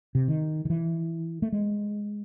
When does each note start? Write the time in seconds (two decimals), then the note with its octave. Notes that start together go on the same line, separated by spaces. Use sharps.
0.15 C3
0.28 D#3
0.65 D#3
0.70 E3
1.42 A3
1.52 G#3